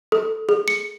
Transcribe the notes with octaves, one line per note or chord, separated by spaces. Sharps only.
A4
G#4
C#7